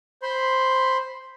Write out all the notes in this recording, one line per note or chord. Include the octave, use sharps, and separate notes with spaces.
C5 B5 C6